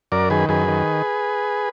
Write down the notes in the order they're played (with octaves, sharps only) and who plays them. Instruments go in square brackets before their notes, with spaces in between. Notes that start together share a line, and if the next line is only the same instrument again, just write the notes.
[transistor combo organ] F#2 A#4 D5
D#3 G#4 B4
F#2 G#4 B4
D#3